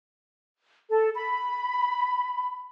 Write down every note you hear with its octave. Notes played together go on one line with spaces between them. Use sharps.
A4
B5